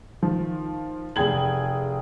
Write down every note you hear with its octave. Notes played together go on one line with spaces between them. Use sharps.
D#3 F3
F1 G#4 G5 G#6 F#7